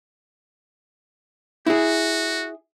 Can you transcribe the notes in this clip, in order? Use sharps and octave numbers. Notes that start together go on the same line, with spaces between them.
E4 F#4 G#4